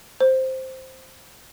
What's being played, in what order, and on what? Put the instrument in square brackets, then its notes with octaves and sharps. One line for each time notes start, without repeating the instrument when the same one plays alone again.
[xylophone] C5